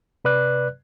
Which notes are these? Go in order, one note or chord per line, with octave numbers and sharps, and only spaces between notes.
C3 B4 D5 F#6